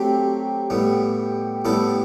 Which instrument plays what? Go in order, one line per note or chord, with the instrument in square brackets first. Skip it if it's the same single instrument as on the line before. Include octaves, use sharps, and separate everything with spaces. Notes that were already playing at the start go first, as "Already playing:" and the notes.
Already playing: [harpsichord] F#3 A3 C4 [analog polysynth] G4
[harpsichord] A2 G3 B3
A2 G3 B3 E4 A4